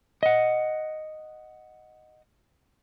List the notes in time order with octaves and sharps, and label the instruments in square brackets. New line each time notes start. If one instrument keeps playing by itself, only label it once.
[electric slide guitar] D#5 F#5